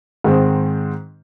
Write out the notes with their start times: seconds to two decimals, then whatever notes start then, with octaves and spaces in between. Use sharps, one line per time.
0.24 G#2 D#3 G#3 C4